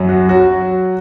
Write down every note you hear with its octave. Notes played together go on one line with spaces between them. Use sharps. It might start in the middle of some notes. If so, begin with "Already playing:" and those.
Already playing: F#2 F#3
F#4
F#3 F#4